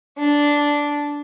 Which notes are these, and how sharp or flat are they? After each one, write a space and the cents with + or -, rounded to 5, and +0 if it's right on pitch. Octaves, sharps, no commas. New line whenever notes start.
D4 -5